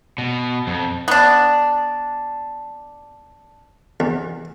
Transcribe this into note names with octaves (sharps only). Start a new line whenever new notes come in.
B2
F2
B3 D4
E2